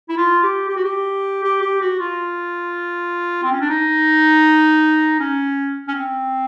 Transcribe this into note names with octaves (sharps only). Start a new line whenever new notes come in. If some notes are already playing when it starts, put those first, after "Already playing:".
E4
F4
G4
G4
F#4
G4
G4
G4
F#4
F4
C4
C#4
D4
D#4
C#4
C#4
C4